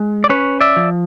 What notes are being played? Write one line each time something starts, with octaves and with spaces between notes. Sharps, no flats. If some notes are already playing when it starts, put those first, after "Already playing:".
Already playing: G#3
D5
C#4 B4 C#5
D5 E5
F3